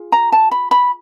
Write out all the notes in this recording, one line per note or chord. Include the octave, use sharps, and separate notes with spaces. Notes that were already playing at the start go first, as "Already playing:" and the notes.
Already playing: F4 G#4
A#5
A5
B5
B5